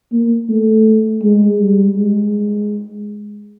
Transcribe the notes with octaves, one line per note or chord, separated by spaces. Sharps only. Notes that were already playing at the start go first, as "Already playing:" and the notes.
A#3
A3
G#3
G3
G#3